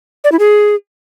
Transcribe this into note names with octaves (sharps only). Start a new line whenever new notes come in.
D5
E4
G#4